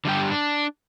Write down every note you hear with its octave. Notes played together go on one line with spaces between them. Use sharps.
D3 G3 G4
D4